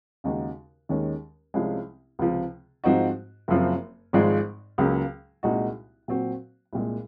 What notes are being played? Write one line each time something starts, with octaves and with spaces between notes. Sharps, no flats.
D#2 C#3 G#3 D#4 F#4
D#2 D#3 G#3 C#4
C2 C3 F3 G#3 C#4
C#2 C3 F3
G#2 F3 C4 D#4 F#4
F#1 F#2 F3 C4
G#1 G#2 F3 G#3
C#2 C#3 F#3 A#3
C2 A#2 G#3 D#4 F#4
A#2 F#3 C4 F#4
C2 A#2 G#3